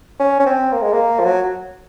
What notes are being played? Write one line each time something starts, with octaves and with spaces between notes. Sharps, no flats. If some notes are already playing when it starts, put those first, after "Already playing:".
C#4
C#4
C4
A#3
G#3
A#3
F3
F#3